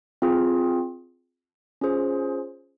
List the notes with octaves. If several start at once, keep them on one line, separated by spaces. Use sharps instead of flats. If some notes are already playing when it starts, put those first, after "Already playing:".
C4 F4 G#4
C#4 F4 G#4 C5